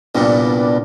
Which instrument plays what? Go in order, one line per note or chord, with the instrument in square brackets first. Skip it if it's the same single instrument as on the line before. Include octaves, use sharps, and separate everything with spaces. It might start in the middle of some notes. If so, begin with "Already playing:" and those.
[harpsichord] C2 G2 A#2 [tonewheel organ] B3 D4